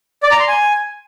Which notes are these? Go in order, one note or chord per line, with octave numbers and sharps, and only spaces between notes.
D5
A#5
C6
G#5